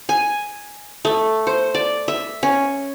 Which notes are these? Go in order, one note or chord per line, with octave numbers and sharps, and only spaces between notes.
G#5
A3
C5
D5
E5
C#4